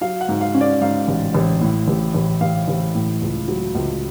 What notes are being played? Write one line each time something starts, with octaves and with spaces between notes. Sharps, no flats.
F#3 F5
F#5
G#2
F5
C#4
D5
G#2 F5
A1
A1
A2
A1
A1
A1 F5
A1
A2
C#2
F#3
C#2